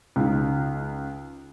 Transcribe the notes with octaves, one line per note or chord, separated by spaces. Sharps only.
C#2 D#4